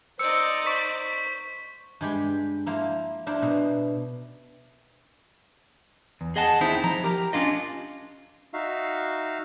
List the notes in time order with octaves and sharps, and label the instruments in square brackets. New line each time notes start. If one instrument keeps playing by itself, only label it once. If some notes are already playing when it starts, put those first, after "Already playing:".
[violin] D#4 D5 [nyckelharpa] C5 D#5 [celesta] E6 C#7
[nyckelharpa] C5 [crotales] C#6 B6
[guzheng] G2 G#3 G4
F3 A#3 E4 F4
D4 E4 A#4 C5
B2
[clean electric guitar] E2
G#4 D#5 F#5 A5
D#2 C4 D#4 E4 G#4 C5
F3 A#5
G4 A#4
C#4 D4 F4 D#5
[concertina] D#4 F#4 E5 F5